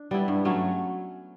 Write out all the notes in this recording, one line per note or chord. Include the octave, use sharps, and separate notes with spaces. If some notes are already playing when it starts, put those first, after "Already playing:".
Already playing: D4
G3 B3 E4
G2
F#3 A3 C#4